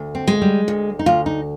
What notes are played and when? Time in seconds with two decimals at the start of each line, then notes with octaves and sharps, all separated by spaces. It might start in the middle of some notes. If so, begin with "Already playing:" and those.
Already playing: D2
0.15 C4
0.28 G#3
0.42 G3
0.68 D2
0.99 D#4
1.06 D2 F4
1.26 D#4